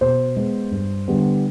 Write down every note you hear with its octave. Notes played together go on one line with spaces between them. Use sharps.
B2 C5
G#3 B3
G2
D3 G3 B3